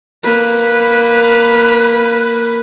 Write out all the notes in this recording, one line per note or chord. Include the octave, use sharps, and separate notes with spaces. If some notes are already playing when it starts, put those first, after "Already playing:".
A#3 B4